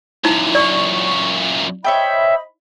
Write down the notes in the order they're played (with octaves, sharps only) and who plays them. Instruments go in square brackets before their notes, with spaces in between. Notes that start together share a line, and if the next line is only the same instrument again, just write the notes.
[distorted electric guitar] F#2 A#2 [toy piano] D#4 E4
[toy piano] D5 [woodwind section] C#6
[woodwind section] C5 D#5 B5 [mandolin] C#5 E5 G5